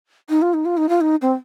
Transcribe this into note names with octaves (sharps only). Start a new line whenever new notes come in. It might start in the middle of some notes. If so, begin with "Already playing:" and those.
D#4
F4
D#4
F4
D#4
F4
D#4
C4